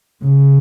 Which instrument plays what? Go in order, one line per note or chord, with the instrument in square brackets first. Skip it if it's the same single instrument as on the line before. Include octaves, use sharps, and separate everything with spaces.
[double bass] C#3